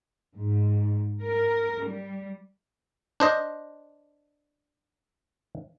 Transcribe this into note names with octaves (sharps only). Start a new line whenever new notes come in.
G#2
A#4
G3
D4 C5 D#5